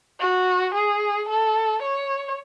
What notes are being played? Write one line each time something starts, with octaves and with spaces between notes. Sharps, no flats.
F#4
G#4
A4
C#5